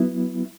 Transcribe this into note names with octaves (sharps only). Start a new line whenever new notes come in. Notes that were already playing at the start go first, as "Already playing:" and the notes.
Already playing: F#3 B3 E4